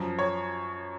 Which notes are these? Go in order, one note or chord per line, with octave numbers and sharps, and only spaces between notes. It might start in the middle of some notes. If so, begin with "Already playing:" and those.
Already playing: F#2 F3
C#5